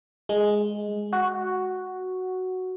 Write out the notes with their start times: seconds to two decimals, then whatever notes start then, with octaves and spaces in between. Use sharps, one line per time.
0.29 G#3
1.13 F#4